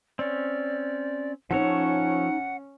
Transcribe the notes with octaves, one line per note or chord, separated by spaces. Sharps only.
C4 C#4 D5
F3 C#4 D#4 A4 C#5 F#5